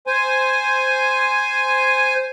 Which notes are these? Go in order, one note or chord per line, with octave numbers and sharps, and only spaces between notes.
C5 G#5